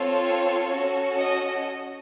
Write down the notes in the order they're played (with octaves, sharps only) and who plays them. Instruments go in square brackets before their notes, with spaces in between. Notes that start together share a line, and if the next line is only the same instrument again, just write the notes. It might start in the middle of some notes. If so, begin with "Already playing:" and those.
Already playing: [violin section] C4 F4 A4 C#5
C#4 F#4 A4
D#5